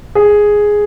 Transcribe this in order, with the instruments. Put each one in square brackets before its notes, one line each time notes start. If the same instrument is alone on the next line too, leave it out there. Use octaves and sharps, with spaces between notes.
[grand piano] G#4